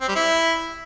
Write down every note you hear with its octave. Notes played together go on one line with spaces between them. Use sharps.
C4
G3
E4